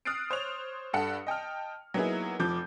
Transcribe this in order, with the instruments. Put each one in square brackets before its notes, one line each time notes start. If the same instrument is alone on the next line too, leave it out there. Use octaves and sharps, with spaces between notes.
[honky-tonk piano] D#6 F6 F#6 A6 C7 D7
C5 C#5 F7
G2 A4 F#5 C#7
D#5 G5 A5 F6
F#3 A#3 B3 D#4 E4 G#4
F1 F3 D6 G6